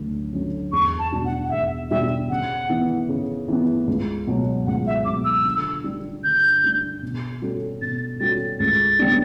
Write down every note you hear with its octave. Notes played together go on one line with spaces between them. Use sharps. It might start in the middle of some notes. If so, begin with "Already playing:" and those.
Already playing: D2 D3 F#3
D3 F#3 C#4
E2 C#6
A5
B2 G3 D4 F#4
F#5
F#5
E2 E5
B2 G3 D4 F#4 E5
C#3 F#5
E3 B3
C#3
E3 B3
C#2
B2 F#3
C#2 F#5
E5
B2 F#3 D6
E6
D3
G3 D4
D3 G6
G3 D4
B2
G3 C#4 F#4 A4
B2 A6
G3 C#4 F#4 A4 A6
C#2 A6
C#3 G3 B3 D4